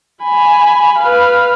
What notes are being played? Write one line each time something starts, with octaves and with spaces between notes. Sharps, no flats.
G#5 B5
B4 F5